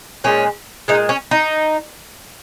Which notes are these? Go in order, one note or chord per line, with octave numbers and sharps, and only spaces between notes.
A#2 G#3 C#4
A#2 G#3 D#4
C#4
D#4